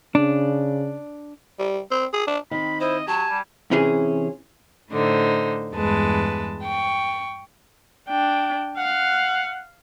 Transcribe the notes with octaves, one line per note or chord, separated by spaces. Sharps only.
C#3 D4
G3
C4
G#4
D4
D#3 C4 D#4 B5
E4 C5 D#5
F#3 G4 G#5 A5
G3
C3 E3 C#4 G#4
A2 D3 D#4 C5
E2 G2 G#3 B4 A5
G5 C#6
D4 G5
F5 F#5